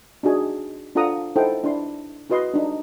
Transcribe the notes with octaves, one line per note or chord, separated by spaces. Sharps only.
D4 D#4 F#4 G#4 G#5
D4 F4 A4 F#5 A#5 D#6
D#4 E4 A4 C5 F#5 G5
D4 E4 C6
E4 F#4 B4 D#5 C6
D4 D#4